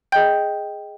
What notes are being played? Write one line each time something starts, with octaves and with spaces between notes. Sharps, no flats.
G#4 D#5 G5 G6